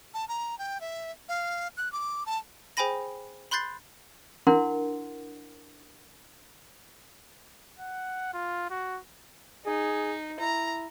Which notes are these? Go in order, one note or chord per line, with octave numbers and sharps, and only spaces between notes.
A5
A#5
G5
E5
F5
F#6
D6
A5
G#4 C5 G5 G#5 B5 A#6
B5 C6 F#6 G6 A6 C7
D4 E4 A#4 F#5 C6
F#5
F4
F#4
D#4 G#4
E4 A#5